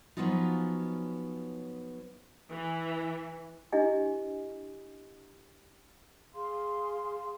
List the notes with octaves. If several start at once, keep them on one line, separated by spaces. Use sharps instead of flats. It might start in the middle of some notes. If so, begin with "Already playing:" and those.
F3 F#3 B3 C#4 D#4 F4
E3
D4 E4 G4 D#5 G#5
G#4 F5 C6